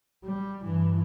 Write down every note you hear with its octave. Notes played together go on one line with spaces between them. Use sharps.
G3
G2 E3